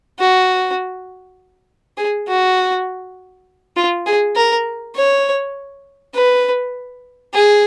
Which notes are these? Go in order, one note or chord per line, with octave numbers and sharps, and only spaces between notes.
F#4
G#4
F#4
F4
G#4
A#4
C#5
B4
G#4